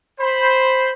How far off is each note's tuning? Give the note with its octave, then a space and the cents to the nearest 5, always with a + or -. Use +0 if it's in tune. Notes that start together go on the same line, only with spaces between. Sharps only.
C5 +0 B5 +0